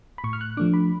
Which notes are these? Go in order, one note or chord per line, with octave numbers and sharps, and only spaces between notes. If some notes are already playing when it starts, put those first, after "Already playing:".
B5
A2 C#6
F6
F#6
F3 A3 D4 D6
B5